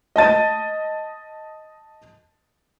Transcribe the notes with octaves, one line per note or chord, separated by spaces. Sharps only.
D#5 A5 A6 D#7